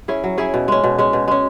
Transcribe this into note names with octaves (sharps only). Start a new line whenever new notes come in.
C#4 E4 G#4
F#3
C#4 E4 G#4
B2
G#3 C#4
B2
G#3 C#4
B2
G#3 C#4